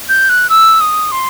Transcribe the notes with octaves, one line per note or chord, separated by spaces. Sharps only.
G6
F#6
E6
D#6
C6